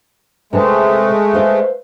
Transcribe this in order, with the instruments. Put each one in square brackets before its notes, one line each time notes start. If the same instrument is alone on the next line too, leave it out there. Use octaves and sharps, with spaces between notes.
[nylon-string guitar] C3 B4 A5 [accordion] G#3 A3
[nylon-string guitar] B4 C5 F5